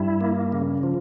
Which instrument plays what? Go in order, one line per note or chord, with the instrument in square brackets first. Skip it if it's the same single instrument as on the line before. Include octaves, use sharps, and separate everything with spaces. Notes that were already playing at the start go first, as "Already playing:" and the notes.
Already playing: [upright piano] G2 [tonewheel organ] E4
[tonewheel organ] A#3
C#3
F3